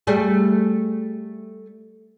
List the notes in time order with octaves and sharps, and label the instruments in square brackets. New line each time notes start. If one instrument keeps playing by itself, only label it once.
[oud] G3 A3 G#4